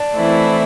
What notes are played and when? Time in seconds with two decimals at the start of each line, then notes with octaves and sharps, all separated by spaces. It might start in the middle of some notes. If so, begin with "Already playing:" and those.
Already playing: D4
0.16 E3 A3 C4 E4